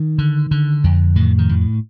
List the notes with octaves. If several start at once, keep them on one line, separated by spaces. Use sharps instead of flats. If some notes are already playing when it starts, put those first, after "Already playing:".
Already playing: D#3
D3
D3
F2
A2 D#3
D#3
A2